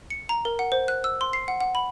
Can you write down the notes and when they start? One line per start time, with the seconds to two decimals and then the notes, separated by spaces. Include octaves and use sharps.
0.10 C#7
0.29 A#5
0.45 A#4
0.59 F#5
0.72 C5
0.88 F#6
1.04 E6
1.21 C6
1.33 C7
1.48 F#5
1.61 F#5
1.75 B5